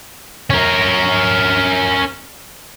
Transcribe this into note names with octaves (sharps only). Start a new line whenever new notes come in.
C#4 A#4